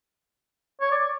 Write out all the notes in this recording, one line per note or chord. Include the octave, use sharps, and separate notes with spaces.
C#5
D5